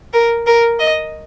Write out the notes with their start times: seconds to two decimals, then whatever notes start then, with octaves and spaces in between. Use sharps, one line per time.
0.13 A#4
0.47 A#4
0.79 D#5